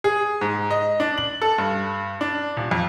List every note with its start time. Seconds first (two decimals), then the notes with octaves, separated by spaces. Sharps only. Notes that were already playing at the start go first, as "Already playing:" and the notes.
0.04 G#4
0.41 G#2
0.70 D#5
1.00 D4
1.18 F#7
1.42 A4
1.58 G2
2.21 D4
2.57 D#1
2.71 F2